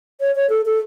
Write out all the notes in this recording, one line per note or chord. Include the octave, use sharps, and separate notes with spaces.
C#5
C#5
A4
A4